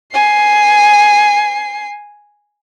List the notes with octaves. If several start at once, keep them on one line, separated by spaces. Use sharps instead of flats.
G#5 C7